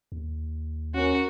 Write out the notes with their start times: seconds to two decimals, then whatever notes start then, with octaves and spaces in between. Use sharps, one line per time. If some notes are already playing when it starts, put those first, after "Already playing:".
0.12 D#2
0.95 C#4 F#4 A#4